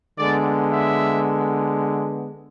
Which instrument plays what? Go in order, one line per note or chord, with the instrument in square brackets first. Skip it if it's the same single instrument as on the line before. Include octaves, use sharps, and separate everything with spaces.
[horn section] D3 G#3 B3 D5
E5